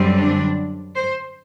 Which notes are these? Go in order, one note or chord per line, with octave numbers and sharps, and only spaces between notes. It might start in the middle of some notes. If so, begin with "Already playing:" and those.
Already playing: F#2 D3 G3 C4
D4
C5